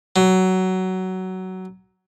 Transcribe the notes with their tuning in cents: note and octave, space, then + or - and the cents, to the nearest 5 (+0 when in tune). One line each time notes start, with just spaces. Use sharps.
F#3 +15